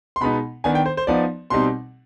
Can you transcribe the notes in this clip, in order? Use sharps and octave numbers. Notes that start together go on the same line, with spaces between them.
C6
B2 G#3 B3 D#4 B5
D#3 B3 D4 G#5
G5
C5
C5
F3 B3 D#4 D5
B2 G3 C4 D#4 C6